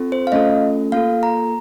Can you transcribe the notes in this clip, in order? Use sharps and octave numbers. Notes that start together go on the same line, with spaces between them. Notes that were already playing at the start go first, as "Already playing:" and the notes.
Already playing: C4 F4 A4
C5
F5
A3 C#4 F4 A4 D#5
A#3 F4 A4 F5
A#5